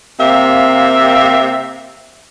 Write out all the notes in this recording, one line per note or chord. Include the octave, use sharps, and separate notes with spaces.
C3 A#3 C4 E5 F5